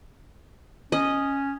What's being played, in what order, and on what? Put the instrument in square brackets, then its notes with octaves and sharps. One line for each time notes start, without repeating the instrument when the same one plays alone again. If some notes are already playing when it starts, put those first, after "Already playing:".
[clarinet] C#4 [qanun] D#5